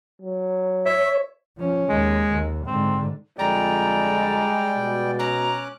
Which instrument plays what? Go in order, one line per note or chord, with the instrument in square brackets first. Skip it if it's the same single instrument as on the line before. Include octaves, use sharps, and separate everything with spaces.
[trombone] F#3
[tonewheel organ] C#5 [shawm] E5
[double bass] F3 C#4
[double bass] D#2 [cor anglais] G#3
[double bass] D#2
[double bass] G#2 D3 [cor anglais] C4
[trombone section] F2 D3 [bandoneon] G3 D5 G5 [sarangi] G#3 [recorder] A#5
[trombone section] B2
[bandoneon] C#4 D6 F#6 [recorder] A#5